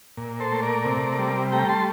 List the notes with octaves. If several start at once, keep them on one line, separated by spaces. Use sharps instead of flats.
A#2
A4 C5
A3
A#4 D5
C3
G3
A3 G5 A#5
A5 C6